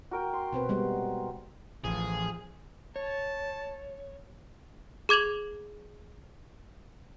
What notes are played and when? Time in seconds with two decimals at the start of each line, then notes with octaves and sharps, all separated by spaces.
0.11 F#4 A#4 G5
0.33 C6
0.53 B2 C4 B4
0.69 G3 G#3 B3
1.85 A1 F3 G#4
2.96 C#5 A5
5.09 G#4 D6 G#6 F7 F#7